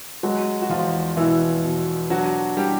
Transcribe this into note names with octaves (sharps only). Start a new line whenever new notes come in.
F#3 G#3 F#4
F#4
E2 F3 F4
B2 E3 E4
B2
F#3 D4 F#4
G3 D4 G4